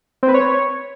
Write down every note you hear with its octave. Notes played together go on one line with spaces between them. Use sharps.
C4
B4
C#5